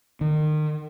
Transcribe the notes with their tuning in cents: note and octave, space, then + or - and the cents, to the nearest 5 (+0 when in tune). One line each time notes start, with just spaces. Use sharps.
D#3 -30